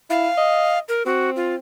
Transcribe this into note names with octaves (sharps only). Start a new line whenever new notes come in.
E4 F5
D#5
A#4
C4 F#4
F4